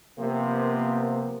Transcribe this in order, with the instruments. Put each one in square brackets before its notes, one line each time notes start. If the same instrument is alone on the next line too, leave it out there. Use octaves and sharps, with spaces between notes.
[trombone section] C3 F3 B3 [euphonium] A#3